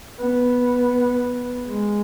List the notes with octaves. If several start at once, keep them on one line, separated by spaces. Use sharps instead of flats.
B3
G#3